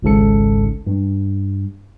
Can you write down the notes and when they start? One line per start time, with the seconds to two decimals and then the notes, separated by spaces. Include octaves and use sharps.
0.03 G#1 C#2 G#2 C#3 A4 C#7
0.87 G2